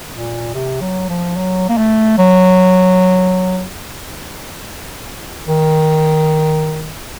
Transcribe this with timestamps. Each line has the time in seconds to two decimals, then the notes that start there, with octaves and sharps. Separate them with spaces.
0.12 A#2
0.54 C3
0.81 F#3
1.09 F3
1.36 F#3
1.69 A#3
1.77 A3
2.18 F#3
5.48 D#3